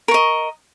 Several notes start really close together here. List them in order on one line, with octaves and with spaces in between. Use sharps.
A#4 C#6 D#5